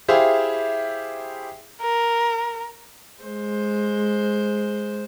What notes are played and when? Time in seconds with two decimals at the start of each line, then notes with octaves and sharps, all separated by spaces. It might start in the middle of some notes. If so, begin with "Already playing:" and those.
0.08 E4 G4 G#4 C5 E5 F5
1.82 A#4
3.24 G#3 C5